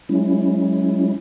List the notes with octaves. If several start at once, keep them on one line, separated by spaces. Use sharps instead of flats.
F#3 G#3 C#4 E4